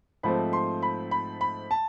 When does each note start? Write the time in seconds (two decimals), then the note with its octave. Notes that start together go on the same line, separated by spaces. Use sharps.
0.23 G#2 F3 A3 C4 B5
0.53 C6
0.82 B5
1.11 B5
1.41 B5
1.71 A5